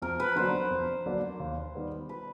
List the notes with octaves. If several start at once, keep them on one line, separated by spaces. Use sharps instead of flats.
F2 A#4
B4
D3 F#3 A#3 D4 C5
F2
D3 F#3 A#3 D4
D#2
D#3 G3 B3
B4